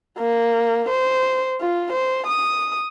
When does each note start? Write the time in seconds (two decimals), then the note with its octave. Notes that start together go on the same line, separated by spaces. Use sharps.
0.19 A#3
0.90 C5
1.61 F4
1.93 C5
2.27 D#6